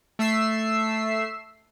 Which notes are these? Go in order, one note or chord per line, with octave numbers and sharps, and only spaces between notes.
A3 E5 E6 C7